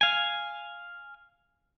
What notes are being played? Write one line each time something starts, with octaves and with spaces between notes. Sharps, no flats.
F5 G#5